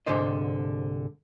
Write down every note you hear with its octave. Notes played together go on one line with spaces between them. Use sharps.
C2 G#2 D3 C5 D#5